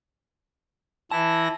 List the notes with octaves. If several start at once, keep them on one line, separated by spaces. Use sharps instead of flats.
E3 E4 A5 A#6